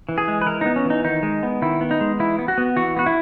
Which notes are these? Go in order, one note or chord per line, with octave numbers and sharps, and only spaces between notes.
E3
G#4
G#3
B4
E3 A#4
B3 D#4
C#4
E3 D#4
D#3 D#4
G#3
B3
D#3 E4
B3
D#4
G#3
E3 E4
B3
F#4
B3
E3 F#4
B3 F#4
E4